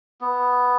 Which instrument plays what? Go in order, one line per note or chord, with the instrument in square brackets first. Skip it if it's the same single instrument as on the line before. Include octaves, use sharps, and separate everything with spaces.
[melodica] B3